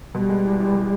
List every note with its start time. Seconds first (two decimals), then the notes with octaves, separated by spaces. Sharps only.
0.14 B2 G3
0.29 G#3
0.45 E2
0.60 E2
0.75 B2